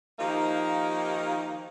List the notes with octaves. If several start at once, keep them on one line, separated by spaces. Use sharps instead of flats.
D#3 F3 A#3 D#4 G4